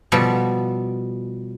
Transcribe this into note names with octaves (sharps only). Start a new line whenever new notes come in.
B2 F3 G3 A4